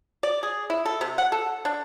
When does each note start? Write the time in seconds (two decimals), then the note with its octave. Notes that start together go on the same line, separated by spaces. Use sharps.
0.23 D5
0.43 G#4
0.70 E4
0.86 A4
1.01 C3
1.18 F#5
1.32 A4
1.65 D4